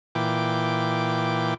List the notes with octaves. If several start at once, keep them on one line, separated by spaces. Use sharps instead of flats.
A#2 E3 G5 D6